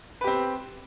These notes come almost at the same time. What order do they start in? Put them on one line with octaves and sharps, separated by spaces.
B4 G4 C4